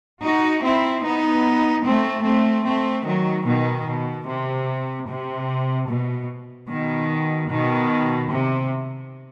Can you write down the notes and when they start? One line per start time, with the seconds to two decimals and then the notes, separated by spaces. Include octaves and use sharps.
0.22 D#4 F#4
0.62 C4 E4
1.03 B3 D#4
1.84 A3 C4
2.24 A3 C4
2.65 A3 C4
3.05 D#3 F#3
3.46 B2 D#3
3.86 B2
4.27 C3
5.07 C3
5.88 B2
6.68 B2 D#3
7.49 B2 D#3
8.31 C3